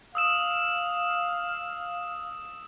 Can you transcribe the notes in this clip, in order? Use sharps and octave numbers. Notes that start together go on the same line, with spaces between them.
F5 D#6 E6 E7